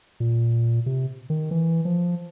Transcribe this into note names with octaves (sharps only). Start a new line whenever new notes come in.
A#2
C3
D#3
E3
F3